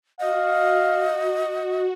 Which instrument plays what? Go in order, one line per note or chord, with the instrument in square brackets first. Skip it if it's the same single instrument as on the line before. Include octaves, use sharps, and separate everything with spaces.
[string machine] F#4 [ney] D#5 [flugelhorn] F5